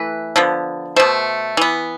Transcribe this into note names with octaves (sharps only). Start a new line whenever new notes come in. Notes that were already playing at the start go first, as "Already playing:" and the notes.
Already playing: E3 A3 B4
D3 F3 B3
B2 A3 C5
E3 B3